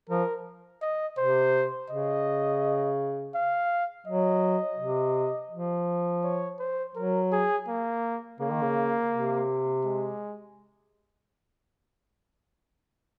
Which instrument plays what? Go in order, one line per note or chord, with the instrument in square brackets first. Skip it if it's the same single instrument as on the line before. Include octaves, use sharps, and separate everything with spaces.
[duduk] F3 [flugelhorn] A#4
[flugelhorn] D#5
[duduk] C3 [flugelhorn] C5
[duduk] C#3 [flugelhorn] D#5
[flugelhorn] F5
[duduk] F#3 [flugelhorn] D#5
[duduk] C3
F3
[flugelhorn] C#5
C5
[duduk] F#3 [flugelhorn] A#4
[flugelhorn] G#4
A#3
[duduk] C#3 [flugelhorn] A#3
[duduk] D#3
C#3
C3
[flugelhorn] G#3